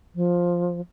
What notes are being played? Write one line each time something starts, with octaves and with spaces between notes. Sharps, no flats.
F3